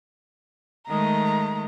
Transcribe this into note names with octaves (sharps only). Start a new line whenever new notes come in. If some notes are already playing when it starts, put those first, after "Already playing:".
D#3 G#3 A3 A#5